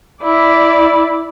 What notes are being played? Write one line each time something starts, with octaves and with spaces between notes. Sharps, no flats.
E4 D5